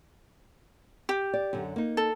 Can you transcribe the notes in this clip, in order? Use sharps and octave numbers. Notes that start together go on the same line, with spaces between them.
G4
D5
F#2 D3
A#3 D#4
A4